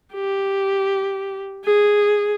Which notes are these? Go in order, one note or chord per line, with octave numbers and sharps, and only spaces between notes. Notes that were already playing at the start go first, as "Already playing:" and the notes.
G4
G#4